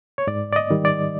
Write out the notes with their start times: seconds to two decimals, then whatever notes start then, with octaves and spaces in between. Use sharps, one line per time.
0.18 C#5
0.27 G#2 D5
0.53 D5
0.56 D#5
0.70 D#3 G3
0.85 D5